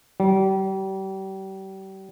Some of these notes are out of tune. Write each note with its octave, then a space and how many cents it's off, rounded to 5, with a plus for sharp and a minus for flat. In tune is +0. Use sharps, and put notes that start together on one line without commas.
G3 -35